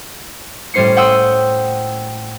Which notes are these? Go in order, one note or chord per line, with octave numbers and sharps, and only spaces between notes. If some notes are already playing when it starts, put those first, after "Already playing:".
A2 G3 C#4 C5 C7 C#7
F#5 G5 C6 D#6 E6